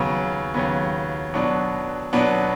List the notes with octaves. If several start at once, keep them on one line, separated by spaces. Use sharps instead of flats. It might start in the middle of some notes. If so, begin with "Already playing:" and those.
Already playing: D#2 C#3 F#3 B3
D#2 C#3 F#3 B3
B2 F#3 B3 D4
B2 F#3 B3 D4